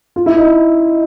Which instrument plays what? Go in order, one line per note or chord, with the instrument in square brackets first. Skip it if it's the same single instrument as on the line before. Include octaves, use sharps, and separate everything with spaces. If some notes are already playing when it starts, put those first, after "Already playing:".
[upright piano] F4
E4
D#4